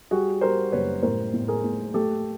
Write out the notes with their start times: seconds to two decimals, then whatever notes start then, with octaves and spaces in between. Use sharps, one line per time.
0.11 G3 F#4 G#4
0.41 G3 A#4 C5
0.72 F#1 B4 C#5
1.02 A2 A#4 C5
1.33 A2
1.48 G#4 A#4
1.64 A2
1.94 A3 G4 A4